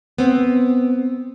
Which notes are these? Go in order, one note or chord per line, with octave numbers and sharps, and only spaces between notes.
B3 C4